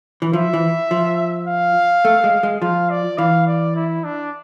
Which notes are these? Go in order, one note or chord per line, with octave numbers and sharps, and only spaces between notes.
E3
F3 E5
E3
F3
F5
A3
G#3
G#3
F3 F5
D5
E3 F5
D5
E4
D4